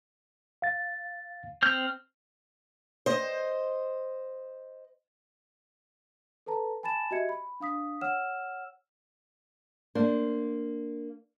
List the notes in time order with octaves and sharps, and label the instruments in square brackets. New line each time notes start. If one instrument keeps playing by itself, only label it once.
[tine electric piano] F5 A6
[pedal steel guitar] C4 F6 G6
[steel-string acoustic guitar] C5 D#5
[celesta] A4 B4 A5 A#5
G#5 A5 B5 A6 E7
F#4 G4 D#5 E5 G#6 C#7
B5
D4 F5 D#6 B6
C#5 F#5 E6 F6 E7
[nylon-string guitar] A#3 D4 C5